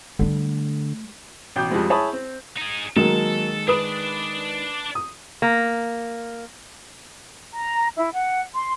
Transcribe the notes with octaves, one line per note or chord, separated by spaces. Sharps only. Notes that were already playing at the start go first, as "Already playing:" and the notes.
D3 G3 A3
A1 B2 G5 D6 G6
F2 F3 G3 G#3 C4
E4 G#4 C#5 A5 B5 D#6
C4
D#4 G#4
D#3 F#3 G#3 A#3 A4 E7
D4 B4 D5 D#6
D#6
A#3
A#5
E4
F#5
C6